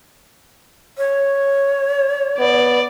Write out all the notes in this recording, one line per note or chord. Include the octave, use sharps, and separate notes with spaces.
C#5
B3 D5